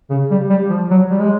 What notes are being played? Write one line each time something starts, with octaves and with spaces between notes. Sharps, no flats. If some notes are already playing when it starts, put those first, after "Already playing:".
C#3
G3
G3
F3
F#3
G3
G#3